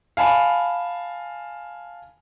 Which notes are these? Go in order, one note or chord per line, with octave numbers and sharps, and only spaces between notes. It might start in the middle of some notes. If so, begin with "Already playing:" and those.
F5 G#5 A5 B5